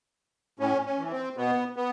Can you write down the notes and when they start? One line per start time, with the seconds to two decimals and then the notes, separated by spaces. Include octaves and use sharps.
0.59 A2 C#4
0.85 C#4
0.98 E3
1.11 C4
1.37 B2 B3
1.76 B3